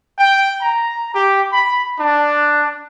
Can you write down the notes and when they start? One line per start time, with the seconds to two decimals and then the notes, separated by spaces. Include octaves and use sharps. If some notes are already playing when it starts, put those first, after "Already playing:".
0.19 G5
0.62 A#5
1.15 G4
1.53 B5
1.99 D4